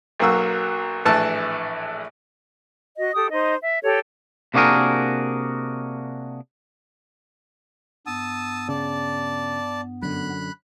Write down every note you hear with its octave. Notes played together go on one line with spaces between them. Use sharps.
B1 F#3 A#3 F#4 E6
A#1 A2 E3 A5 E6
F#4 D#5
G4 A4 D#6
D#4 C5 D#5
E5
G4 A4 C#5
C3 A#3 D4 F#4 G#4 A#4
G2 B3 A5 D#6 E6
C#3 D5 A5
F#2 D3 B5 F#6